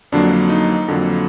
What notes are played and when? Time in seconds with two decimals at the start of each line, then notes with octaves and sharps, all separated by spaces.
0.12 F2 D3 F#3 A#3 D4
0.49 D#4
0.88 F2 D3 F#3 A#3